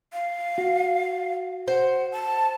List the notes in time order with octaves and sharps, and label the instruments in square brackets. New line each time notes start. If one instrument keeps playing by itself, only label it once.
[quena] F5
[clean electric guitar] F#4
[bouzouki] C5 [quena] F#5
[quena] A5